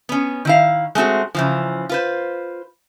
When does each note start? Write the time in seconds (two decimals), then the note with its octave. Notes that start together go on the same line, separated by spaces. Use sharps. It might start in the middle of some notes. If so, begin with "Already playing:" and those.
0.09 B3 C#4
0.45 D#3 E4 F5
0.95 G#3 A3 C4 F#4
1.35 C#3 E3 F3
1.89 F4 B4 C5